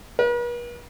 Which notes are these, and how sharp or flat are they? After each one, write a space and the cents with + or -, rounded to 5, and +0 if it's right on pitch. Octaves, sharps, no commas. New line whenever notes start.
B4 -45